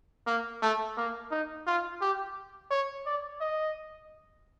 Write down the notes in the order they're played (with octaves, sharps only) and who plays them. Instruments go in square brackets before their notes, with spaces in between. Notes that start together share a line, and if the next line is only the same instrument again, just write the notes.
[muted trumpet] A#3
A3
A#3
D#4
F4
G4
C#5
D5
D#5